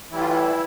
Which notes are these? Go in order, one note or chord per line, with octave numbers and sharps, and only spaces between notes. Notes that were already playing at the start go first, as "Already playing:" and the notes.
A2 E3 G3 E4
F4
E4